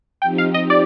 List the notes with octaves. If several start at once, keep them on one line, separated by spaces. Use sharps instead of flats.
F3 C4 D#4 G4 G5
F5
D#5
D5